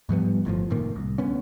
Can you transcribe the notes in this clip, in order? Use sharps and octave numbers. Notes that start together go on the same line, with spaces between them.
G#2 F3 G3 B3
G1 A2 C3 F3
F1 A2 D#3 A#3
C2
D2 B3 C#4